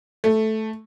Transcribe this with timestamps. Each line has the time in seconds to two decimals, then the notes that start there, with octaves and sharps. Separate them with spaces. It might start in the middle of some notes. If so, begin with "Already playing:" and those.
0.24 A3